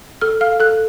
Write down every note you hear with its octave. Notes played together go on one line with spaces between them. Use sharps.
A4 F6
F5 F6
A4 F#6